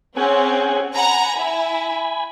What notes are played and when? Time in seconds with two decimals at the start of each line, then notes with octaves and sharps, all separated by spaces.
0.17 C4 C#4 G#4 F#5 G#5
0.95 F#5 G#5 A#5 B5
1.38 E4